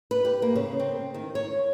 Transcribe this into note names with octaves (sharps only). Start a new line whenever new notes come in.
B4
G4
A#3
C#3
C4
D#3
C#5